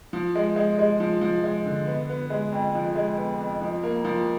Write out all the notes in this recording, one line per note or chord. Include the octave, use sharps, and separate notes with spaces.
F3
G#3
G#3
G#3
F3
F3
G#3
D3
B3
B3
G#3
F2
F3
G#3
B3
F2
F3
A#3
F3